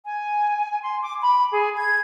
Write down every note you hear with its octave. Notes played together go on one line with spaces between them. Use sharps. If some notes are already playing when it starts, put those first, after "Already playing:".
G#5
C6
D6
B5
G#4
G#6